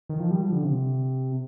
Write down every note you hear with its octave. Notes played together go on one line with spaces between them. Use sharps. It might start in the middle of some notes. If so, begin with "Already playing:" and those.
D#3
F3
G3
F3
D3
C3